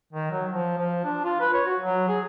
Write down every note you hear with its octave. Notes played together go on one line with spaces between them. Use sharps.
D#3
F#3
F3
F3
D4
F4
B4
C#5
F#4
F#3
G#4